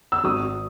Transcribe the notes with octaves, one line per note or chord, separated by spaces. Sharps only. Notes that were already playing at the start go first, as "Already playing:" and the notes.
E6
G#1 D#6